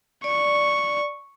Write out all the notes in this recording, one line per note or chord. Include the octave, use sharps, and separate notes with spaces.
D5 C#6